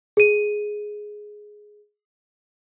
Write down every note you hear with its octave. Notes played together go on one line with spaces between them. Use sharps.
G#4 D#7